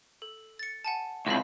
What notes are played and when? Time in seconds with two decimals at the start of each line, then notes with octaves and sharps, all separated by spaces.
0.22 A4
0.59 A6 C#7
0.84 F#5 G#5 A5
1.26 C#2 C3 D#5 F5 B5